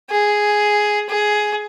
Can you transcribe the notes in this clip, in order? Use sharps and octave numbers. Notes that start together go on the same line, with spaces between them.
G#4
G#4